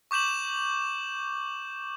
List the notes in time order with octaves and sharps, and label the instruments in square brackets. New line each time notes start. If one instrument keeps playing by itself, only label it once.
[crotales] C#6 D6 G6 E7 F#7